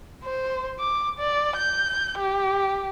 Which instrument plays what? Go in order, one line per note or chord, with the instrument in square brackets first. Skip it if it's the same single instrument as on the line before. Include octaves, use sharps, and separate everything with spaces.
[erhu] C5
D6
D5
G6
G4